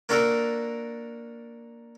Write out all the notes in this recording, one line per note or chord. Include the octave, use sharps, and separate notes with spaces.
A#3 D4 F#4 A4 A#4